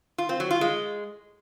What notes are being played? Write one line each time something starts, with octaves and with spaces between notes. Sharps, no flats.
F4
C4
F#3
F4
G#3